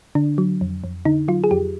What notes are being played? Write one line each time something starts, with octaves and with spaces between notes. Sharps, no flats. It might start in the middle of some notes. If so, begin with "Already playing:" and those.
D3 D4
F#3
F2
F2
D3 D#4
F#3 F4
G#4
F2 G4